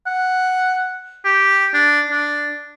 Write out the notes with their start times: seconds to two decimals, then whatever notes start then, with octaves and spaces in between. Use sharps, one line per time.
0.07 F#5
1.25 G4
1.74 D4
2.11 D4